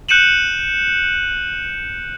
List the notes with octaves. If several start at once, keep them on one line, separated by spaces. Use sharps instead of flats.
F#6 G6 C#7 D#7 E7 F#7